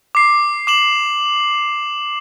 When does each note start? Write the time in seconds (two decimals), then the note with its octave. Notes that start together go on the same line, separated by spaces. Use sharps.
0.15 D6 C7
0.67 D6 E7 F#7